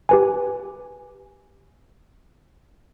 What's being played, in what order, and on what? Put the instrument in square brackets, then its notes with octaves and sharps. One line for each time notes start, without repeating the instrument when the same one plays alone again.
[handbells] G4 B4 G#5